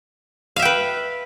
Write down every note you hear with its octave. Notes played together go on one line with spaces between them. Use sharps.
B4 E5 F5 G5